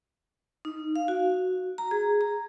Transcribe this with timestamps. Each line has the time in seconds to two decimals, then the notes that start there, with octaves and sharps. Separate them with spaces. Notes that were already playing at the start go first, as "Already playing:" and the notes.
0.65 D#4
0.96 F5
1.08 F#4
1.78 A#5
1.91 G#4
2.21 A#5